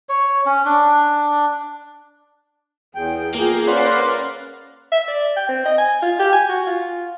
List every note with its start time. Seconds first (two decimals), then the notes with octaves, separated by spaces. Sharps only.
0.09 C#5
0.46 C#4
0.65 D4
2.95 E2 G#4 G5
3.35 A#3 F4 G#4
3.68 C#4 B4 C5 D5 F5 F#5
4.92 E5
5.08 D5
5.36 G5
5.49 C4
5.65 D#5
5.78 G#5
6.02 F4
6.19 G4
6.33 G#5
6.49 F#4
6.67 F4